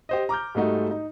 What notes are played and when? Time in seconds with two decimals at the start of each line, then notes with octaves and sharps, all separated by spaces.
0.09 G4 C5 D#5
0.29 A#5 D6 F6 G6
0.55 G#2 G3 A3 D#4 F#4
0.91 D#4